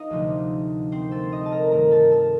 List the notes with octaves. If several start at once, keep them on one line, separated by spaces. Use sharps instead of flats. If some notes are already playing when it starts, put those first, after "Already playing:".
Already playing: D#4 D#5 F5
D2 C3 F3 A3
C4 C5
A3 A4
D#4 D#5
A5
A#4 A#5
G2 D#3 A3 A#4 A#5
A4 A5
A4 A5